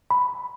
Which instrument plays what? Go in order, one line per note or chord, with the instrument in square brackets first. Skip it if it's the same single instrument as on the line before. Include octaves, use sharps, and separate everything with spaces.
[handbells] B5